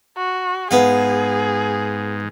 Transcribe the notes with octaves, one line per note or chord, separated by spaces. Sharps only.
F#4
G#2 B3 G#4 F5